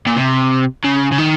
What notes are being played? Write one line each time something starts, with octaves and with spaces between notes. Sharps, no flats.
A#2
C3
C#3
C#3
D#3